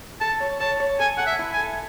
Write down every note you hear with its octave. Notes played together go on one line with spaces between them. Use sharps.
A4 A5
C#5
C#5 A5
C#5
A4 G#5
A4 F#5
E5
E4
G#5
A4